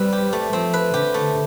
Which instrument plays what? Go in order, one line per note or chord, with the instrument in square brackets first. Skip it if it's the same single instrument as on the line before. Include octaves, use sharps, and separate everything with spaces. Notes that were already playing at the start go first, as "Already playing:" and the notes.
Already playing: [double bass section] G3 [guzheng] C4 B4
[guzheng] G4
A3
[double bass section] F3 [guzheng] C4
[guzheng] B4
[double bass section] D3 [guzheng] G4
[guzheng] A3